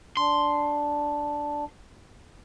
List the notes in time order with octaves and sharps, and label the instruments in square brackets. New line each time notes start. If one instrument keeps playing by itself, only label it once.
[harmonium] D4 [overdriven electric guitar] C6